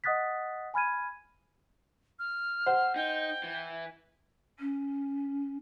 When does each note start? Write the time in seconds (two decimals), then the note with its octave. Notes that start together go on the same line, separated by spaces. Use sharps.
0.04 D#5 F#5 D#6 F#6 A6 B6
0.74 G#5 B5 F6 G#6 D#7
2.19 F6
2.66 C5 F#5
2.96 D#4 G5
3.44 E3
4.59 C#4